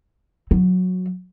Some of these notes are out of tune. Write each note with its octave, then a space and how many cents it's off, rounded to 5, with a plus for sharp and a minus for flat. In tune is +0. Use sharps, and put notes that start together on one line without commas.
F#3 -15